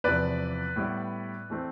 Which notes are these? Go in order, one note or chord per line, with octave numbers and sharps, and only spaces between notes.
E2 C3 F3 B4 D5
A2 G3 B3
E3 A3 C4